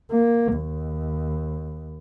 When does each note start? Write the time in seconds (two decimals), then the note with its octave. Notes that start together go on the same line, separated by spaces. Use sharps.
0.11 A#3
0.56 D#2